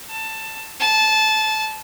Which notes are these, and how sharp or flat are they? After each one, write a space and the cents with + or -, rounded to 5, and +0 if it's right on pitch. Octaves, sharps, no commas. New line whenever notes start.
A5 +15
A5 -20